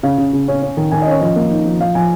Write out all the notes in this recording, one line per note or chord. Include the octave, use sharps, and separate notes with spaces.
C#3 F5
C#3
C#3
C#4
C#4
D#3
D#3 G#5
D#5
C#4 C#5
F3 D#5
A#3
D#4
F3
F3 F5
F3 G#5